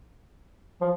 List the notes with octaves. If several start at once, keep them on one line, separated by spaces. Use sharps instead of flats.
F3